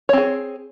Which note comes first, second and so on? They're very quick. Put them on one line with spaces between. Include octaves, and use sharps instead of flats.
C#5 C4 G#4